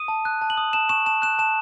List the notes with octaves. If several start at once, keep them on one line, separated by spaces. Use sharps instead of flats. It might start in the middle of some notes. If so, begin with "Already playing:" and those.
Already playing: D#6 D#7
A5
F#6
A5
F#7
D#6
A5 E7
C#6 E7
A5 E7
F#6 E7
A5 E7